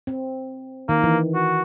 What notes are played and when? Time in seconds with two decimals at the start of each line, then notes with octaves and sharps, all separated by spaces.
0.07 C4
0.89 D#3 A#3
1.04 E3
1.35 F#4